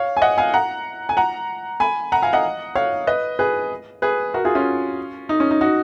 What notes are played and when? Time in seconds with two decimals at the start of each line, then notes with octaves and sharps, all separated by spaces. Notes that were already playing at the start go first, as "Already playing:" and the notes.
Already playing: C#5 F5
0.17 G#5
0.22 D#5 F#5
0.38 F5 G#5
0.54 F#5 A#5
1.09 G#5
1.17 F#5 A#5
1.80 G#5 B5
2.12 F#5 A#5
2.22 F5 G#5
2.33 D#5 F#5
2.75 C#5 F5
3.07 B4 D#5
3.39 G#4 B4
4.02 G#4 B4
4.34 F#4 A#4
4.45 F4 G#4
4.55 C#4 F4
5.29 D#4
5.40 C#4
5.51 D#4
5.61 D#4 F#4